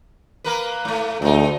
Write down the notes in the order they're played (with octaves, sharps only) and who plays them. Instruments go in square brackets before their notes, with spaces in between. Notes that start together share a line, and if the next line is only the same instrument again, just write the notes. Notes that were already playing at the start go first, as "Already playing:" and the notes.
[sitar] A#3 A#4 B4
G#2 A3
[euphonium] D2 [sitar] G#3 D#4